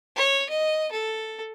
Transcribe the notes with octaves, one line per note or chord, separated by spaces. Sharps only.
C#5
D#5
A4